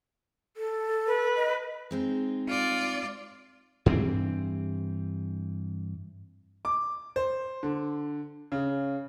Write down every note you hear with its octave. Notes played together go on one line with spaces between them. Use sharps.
A4
B4
D#5
G#3 C4 D#4
F4 D5
G2 E3 C4
D6
C5
D3
C#3